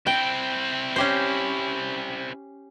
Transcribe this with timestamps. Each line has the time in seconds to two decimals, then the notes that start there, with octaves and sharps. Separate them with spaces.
0.07 C4 E4 G5
0.96 C#4 G4 C5